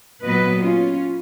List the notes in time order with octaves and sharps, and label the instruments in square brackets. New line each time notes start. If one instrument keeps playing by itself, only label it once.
[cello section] A#2 F#3 B3 B4 D#5
C#4 F4